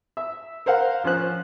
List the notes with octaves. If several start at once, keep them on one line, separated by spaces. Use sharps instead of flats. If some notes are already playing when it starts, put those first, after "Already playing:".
E5
A#4 C5 F5 F#5
F3 C#4 C5 F#6